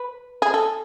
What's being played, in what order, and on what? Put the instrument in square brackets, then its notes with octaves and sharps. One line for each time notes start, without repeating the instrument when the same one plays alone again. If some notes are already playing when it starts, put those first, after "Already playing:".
Already playing: [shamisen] B4
G#4
A4